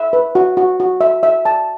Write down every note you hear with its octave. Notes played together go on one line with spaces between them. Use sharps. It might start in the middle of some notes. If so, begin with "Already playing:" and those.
Already playing: E5
B4
F#4
F#4
F#4
E5
E5
A5